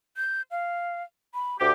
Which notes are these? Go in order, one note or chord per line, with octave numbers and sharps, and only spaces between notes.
G6
F5
B5
D2 G4 D6